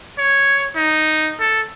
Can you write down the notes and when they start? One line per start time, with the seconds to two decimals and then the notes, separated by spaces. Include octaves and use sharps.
0.18 C#5
0.76 D#4
1.40 A4